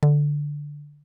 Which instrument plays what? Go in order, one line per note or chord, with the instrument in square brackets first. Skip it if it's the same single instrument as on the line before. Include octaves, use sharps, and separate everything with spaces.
[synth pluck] D3